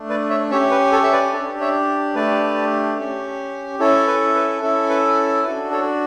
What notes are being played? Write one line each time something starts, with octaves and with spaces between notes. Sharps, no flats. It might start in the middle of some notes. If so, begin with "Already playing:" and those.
Already playing: A3 D4
B4 D5
C#5 E5
C#4 G4 C#5 E5
B4
A4 C#5
E5
B4 D5
D4 G4 A4 C#5
C#5 E5
A3 D4 G4 B4 D5
C#4 G4
C#4 E4 A4 C#5
B4
B4
C#4 E4 A4
B4
D4 F#4 A4 B4
A4 C#5